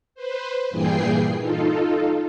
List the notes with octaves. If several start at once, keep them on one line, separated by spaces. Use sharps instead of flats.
B4 C5
G2 A#2 E3 G#4 G5 C7
D#4 F4 A4